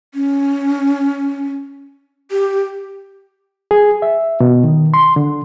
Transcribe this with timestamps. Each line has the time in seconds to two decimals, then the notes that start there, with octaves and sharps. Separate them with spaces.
0.14 C#4
2.31 G4
3.71 G#4
4.02 E5
4.40 B2
4.64 D#3
4.94 C6
5.16 D3